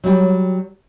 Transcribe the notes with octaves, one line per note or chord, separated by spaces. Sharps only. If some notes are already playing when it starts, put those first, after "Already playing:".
F#3 G3